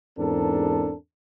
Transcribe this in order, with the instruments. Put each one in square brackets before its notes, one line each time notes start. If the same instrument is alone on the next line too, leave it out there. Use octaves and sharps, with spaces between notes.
[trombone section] E2 G#2 C4 D4 A4 A#4